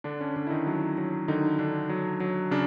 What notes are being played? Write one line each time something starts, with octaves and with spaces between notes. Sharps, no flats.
D3 D4
C#4
D3 D4
E4
D#3 D#4
F#3
F#3
D3 D#3 D#4
D3 D4
F#3
F#3
C#3 D4